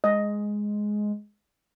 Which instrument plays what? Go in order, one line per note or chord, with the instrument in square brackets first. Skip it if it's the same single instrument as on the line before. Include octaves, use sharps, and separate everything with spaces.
[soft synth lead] G#3 [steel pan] D#5